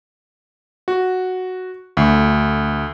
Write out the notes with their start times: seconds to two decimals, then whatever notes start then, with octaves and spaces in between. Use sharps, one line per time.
0.88 F#4
1.97 D2